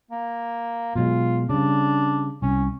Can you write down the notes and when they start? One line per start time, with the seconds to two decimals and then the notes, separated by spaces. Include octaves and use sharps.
0.11 A#3
0.95 B2 F#3 G#3 F4
1.49 C#3 G3 D4
2.42 C2 C#4